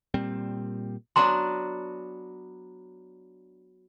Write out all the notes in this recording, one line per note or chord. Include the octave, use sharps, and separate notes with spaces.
A#2 G3 C4
F#3 B3 D4 A#5 C6